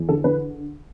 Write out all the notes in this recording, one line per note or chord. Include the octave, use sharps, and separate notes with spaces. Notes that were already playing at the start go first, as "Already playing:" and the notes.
Already playing: E2
D3 A4
D3 B4